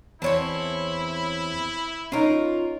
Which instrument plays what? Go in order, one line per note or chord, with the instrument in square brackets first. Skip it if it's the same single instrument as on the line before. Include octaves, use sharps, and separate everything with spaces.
[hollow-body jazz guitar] E2 [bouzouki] C4 C#5 A5 [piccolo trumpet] E4
[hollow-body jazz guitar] C#4 D#4 [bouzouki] F4 A#4